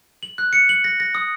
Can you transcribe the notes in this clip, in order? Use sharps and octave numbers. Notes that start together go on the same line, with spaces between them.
F#7
F#6
C#7
F#7
A#6
A#6
D#6